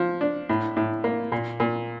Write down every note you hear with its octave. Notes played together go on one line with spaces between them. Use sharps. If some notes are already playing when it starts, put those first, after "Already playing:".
Already playing: F3
D4
A2
A2
A#3
A#2
A#2